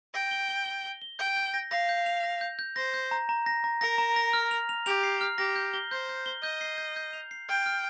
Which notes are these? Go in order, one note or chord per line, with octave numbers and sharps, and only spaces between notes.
G5 A#6
G7
G7
G7
G7
G7
G5 G6
G6
A#6
F5 A#6
G6
F7
A#6
G6
G6
C5 A#6
G6
A#5
A#5
A#6
A#5
A#4 A#6
A#5
A#6
F6
F7
F7
G4 F7
C7
F6
G4 A#6
G6
G7
C5 G6
G6
G7
D#5 G6
C7
G6
G6
F7
C7
G5 F6
F6